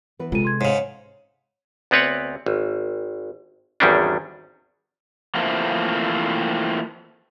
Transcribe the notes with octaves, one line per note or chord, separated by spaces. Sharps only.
E3 B3 B4
C3 G#3 F4 A4 D#7
C6 G#6
G#2 C#3 C#5
D2 B3 C4 B4 C#5 F#5
G#1
G#1 E2 D#3 G3 C#4 D4
E3 F3 A3 A#3 C4